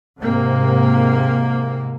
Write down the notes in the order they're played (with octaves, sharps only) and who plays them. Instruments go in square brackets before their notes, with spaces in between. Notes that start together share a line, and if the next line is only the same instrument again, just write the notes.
[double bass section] G#2 C3 A#3